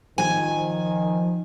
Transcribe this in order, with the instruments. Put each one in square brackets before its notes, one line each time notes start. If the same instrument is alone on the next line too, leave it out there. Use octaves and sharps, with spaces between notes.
[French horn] D#3 [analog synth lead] F3 [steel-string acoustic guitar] G#5